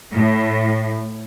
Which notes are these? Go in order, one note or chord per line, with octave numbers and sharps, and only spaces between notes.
A2